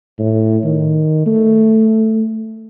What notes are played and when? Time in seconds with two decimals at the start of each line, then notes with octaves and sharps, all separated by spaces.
0.19 A2
0.64 D#3
1.26 A3